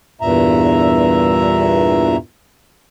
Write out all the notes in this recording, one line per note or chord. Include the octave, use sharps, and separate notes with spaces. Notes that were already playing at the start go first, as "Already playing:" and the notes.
E2 G2 A#2 E5 A#5